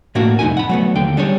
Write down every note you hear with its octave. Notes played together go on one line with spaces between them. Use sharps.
A2 A3 A#3 D4 F#4
C2 F2 D#4 E4 G#5
F#5 B5
F#3 A3 B3
D#2 D3 G5
G3 D4 G#4 C#5